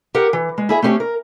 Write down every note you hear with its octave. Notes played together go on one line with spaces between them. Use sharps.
G4 A#4 F#5
E3
G#3
E4 G#4 E5
A3 C4 C#4 G4
A#4